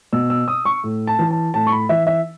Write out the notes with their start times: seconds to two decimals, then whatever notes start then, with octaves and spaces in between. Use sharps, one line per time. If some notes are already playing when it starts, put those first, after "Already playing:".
0.13 B2 E6
0.30 E6
0.48 D#6
0.65 C#6
0.84 A2
1.07 A5
1.19 E3
1.31 A5
1.54 A2 A5
1.67 C#6
1.72 B5
1.89 E3 E5
2.07 E5